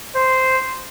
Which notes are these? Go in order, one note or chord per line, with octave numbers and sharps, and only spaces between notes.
C5